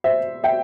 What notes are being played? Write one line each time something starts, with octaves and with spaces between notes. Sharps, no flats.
C5 E5
E5 G5